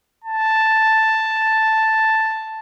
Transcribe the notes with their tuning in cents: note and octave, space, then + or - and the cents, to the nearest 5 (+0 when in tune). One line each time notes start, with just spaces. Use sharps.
A5 +0